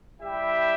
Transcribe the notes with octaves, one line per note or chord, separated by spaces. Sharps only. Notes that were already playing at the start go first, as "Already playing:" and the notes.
G3 E4 G4 E5 G5